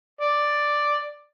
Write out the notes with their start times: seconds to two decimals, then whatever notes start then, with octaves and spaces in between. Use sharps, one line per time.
0.21 D5